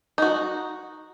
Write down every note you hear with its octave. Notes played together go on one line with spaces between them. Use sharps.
D#4 F#4